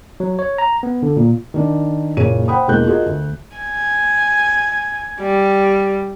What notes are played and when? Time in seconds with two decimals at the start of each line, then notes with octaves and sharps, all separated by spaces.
0.20 F#3
0.39 C#5
0.58 A#5
0.83 B3
1.03 D3
1.17 A#2
1.54 D#3 D4
2.17 F#1 A#2 G#4 C#5 D#7
2.48 C5 F#5 G5 B5 D#6
2.68 E1 E2 G#3 A#3 F#6 G6
2.86 F4 F#4 G#4 A#4 D#5
3.06 D2
3.56 G#5
5.21 G3